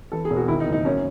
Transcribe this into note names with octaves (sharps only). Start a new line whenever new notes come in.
E3 A4
G#4
E1
F#4
D#3 E4
D#4
F#1
D#4
F#2 C#4